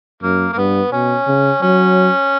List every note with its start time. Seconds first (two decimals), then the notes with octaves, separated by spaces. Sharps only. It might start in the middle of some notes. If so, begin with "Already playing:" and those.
0.23 F#2 A#3
0.53 A#3
0.57 G2 B3
0.92 B2 C#4
1.27 C#3
1.62 F#3 C#4